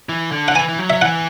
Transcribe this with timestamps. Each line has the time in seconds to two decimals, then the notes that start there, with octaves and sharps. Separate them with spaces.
0.09 E3
0.31 D3
0.48 F#5
0.55 E3 G#5
0.69 E3
0.79 F#3
0.90 E5
1.02 E3 F#5